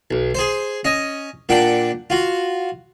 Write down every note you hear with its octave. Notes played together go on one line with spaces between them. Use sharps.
B1
G#4 C5
C#4 D#5
A#2 D4 F#5 G5
F4 F#4